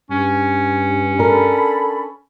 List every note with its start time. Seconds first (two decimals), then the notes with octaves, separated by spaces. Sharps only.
0.11 G2 C#4
1.19 D4 A4 A#4 B5